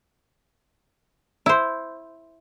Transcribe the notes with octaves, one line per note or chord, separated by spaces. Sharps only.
E4 C5